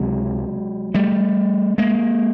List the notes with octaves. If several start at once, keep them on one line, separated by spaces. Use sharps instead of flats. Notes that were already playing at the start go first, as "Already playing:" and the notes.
Already playing: C#2 C3 F#3 G#3
G3 A3
G#3 A#3